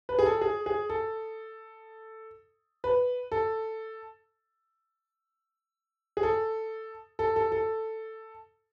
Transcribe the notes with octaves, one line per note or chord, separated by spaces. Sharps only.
B4
G#4
A4
G#4
G#4
A4
B4
A4
G#4
A4
A4
A4
A4